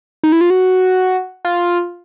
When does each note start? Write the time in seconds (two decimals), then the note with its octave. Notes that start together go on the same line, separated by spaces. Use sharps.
0.23 D#4
0.32 E4
0.41 F4
0.50 F#4
1.45 F4